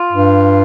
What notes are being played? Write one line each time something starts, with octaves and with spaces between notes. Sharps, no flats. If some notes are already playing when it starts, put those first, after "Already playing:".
Already playing: F4
G2